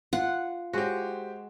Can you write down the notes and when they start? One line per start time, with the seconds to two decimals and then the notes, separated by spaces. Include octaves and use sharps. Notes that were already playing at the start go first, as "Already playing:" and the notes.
0.13 F4 F#5
0.73 G#3 F#4 G4 C5